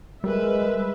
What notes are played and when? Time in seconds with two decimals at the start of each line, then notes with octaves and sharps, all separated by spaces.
0.24 G3 G#3 A#4 B4 E5